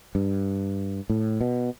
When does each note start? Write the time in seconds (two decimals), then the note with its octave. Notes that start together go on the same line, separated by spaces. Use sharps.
0.15 G2
1.10 A2
1.41 B2